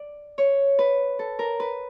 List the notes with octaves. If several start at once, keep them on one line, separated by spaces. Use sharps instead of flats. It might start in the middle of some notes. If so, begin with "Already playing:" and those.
Already playing: D5
C#5
B4
A4
A#4
B4